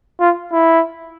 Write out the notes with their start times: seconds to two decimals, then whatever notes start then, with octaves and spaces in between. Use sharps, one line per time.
0.20 F4
0.53 E4